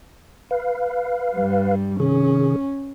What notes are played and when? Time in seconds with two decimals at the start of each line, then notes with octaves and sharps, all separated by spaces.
0.51 B4 F5
1.36 G2 G3
2.00 C3 D#3 C#4 G#4